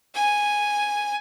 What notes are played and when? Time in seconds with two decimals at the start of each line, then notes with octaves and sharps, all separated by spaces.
0.15 G#5